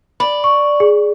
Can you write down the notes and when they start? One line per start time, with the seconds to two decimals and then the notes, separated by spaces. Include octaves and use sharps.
0.20 D5 B5
0.44 C#6
0.80 G#4